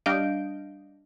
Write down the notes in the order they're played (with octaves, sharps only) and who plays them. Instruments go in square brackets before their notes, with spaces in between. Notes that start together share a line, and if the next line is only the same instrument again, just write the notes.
[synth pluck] G3 D4 D#5 F5 G6 D7